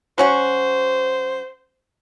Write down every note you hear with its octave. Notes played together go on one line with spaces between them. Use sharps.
F#3 C#4 F#4 C5